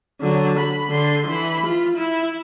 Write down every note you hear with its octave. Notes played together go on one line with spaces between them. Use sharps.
D3 F#3
B5
D3 C6
E3 B5
F4
E4